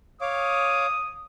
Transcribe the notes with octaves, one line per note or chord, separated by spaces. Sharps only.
C#5 F5 D6 D#6